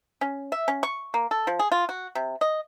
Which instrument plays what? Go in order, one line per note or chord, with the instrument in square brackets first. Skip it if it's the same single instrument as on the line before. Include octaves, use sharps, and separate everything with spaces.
[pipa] C#4
E5
C#4
C#6
A#3
A4
F3
G#4
F4
F#4
C3
D#5